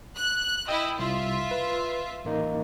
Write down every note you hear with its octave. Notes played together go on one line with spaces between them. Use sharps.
F#6
E4 D#5 G5 D#6 E6
C2 F4 E5
B4
A1 A#3 D#4